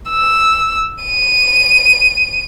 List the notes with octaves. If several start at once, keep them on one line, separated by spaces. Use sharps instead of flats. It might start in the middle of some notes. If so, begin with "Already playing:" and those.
E6
D#7